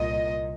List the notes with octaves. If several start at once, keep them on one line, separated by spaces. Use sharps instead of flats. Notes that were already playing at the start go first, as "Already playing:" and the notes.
Already playing: C2 A#2 D#5